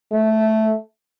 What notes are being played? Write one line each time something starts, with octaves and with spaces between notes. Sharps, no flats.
A3